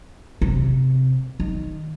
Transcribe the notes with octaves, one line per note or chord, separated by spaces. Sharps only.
C3
D#3